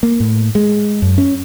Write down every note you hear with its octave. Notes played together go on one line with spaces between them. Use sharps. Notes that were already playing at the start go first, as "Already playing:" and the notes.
A#3
A2
G#3
F#2
C#4